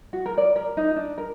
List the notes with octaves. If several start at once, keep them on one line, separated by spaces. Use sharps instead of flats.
F#4
A#4
D5
A#4
D#4
D4
A#4